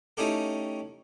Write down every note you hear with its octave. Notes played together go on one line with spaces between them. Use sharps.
A3 C#4 D#4 E4 G4 A4